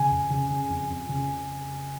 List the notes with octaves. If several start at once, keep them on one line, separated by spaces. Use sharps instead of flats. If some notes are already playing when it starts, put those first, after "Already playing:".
Already playing: C#3 G#5
F2
C#3
C#3
F2
F2
C#3